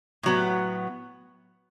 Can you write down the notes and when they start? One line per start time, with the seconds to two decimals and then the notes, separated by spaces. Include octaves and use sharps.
0.23 A2 F#3 B3